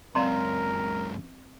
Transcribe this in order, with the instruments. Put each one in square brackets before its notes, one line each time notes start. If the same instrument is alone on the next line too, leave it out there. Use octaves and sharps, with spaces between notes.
[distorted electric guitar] C#2 F#2 [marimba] C4 F5 [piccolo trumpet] A#4 [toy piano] D5 A#5 C6